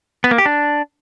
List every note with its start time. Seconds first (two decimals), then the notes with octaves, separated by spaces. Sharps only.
0.24 B3
0.31 A#3
0.38 G4
0.46 D4